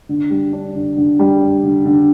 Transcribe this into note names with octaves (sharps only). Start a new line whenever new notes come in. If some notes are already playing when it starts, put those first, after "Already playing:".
D3
G3
D4
D3
D3
G3
D4
D3
D3